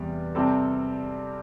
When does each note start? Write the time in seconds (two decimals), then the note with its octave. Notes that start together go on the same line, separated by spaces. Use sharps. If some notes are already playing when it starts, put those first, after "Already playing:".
Already playing: E2 C3 G3
0.35 C3 G3 C4 A4